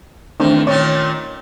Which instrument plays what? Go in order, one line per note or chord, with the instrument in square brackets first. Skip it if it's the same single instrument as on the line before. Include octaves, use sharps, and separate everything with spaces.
[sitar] E2 D#3 [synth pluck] A3 C4 D4
[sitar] A#2 D#3 C#4 [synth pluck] C#5